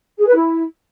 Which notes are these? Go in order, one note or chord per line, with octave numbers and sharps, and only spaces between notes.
G#4
B4
E4